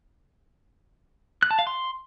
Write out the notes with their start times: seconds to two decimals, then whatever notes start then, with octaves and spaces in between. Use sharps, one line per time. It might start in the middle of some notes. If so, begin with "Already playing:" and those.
1.43 F#6
1.51 A5
1.59 F5
1.67 C6